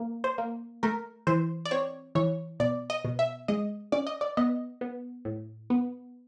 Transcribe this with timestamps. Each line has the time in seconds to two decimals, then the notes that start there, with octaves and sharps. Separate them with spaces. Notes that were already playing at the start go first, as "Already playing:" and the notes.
Already playing: A#3
0.24 C5
0.38 A#3
0.83 A3 A#4
1.27 E3 C5
1.65 D5
1.71 C4 C#5
2.15 E3 C#5
2.60 B2 D5
2.90 D#5
3.05 B2
3.19 E5
3.48 G#3 D#5
3.92 C#4 D5
4.07 D#5
4.21 D5
4.37 B3 D#5
4.81 B3
5.25 A2
5.70 B3